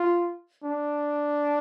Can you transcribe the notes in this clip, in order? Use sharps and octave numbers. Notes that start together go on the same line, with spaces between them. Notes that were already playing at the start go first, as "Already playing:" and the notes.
Already playing: F4
D4